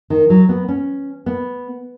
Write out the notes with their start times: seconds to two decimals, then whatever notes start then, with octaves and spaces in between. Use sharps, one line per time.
0.10 D#3
0.30 F#3
0.49 B3
0.68 C#4
1.26 B3